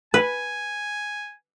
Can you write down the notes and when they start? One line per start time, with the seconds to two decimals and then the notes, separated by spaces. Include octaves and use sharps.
0.14 B4 G#5